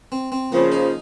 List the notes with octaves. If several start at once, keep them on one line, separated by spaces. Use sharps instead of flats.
C4
C4
C#3 F3 A#3
D#4